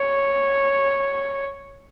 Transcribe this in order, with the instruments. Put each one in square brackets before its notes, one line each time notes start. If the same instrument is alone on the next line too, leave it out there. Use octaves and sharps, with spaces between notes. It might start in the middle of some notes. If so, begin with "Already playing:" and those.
Already playing: [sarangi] C#5